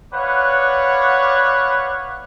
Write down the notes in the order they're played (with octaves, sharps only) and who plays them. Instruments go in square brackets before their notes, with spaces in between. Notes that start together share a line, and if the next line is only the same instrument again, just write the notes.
[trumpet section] B4 C#5 D5 F5 F#5